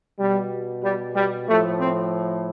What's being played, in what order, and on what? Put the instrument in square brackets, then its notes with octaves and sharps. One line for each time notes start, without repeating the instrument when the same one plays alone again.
[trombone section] B2 G3
G3
G3
A2 F3 A3
C4